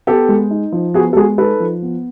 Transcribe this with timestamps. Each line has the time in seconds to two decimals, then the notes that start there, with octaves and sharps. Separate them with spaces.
0.07 B3 G4 A4
0.29 G#3
0.51 D#4
0.72 F3
0.94 B3 F#4 G#4
1.13 A4
1.16 G#3 F#4 G#4
1.38 D#4 A4 B4
1.60 F3
1.82 B3